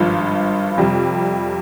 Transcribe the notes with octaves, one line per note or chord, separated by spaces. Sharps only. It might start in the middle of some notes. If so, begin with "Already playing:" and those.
Already playing: G#1 G2 F3
F2 C3 G3